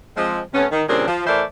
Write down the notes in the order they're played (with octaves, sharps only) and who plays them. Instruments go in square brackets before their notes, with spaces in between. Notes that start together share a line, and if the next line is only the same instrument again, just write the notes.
[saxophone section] F3 G#3 C4
C3 A3 B3 C#4
D#3
A#2 C#3 G3 C4 D4 A#4
F3
E3 A3 A#4 C5 D5 E5